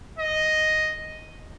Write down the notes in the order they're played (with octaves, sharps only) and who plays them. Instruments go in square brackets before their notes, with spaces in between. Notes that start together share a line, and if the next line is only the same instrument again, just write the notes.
[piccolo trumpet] D#5